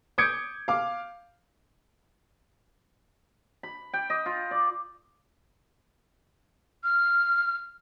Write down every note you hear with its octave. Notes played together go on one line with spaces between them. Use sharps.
D6 D#6 G6 G#6 C#7 D7
F5 D6
B5
G5
D#5
F4
D5
F6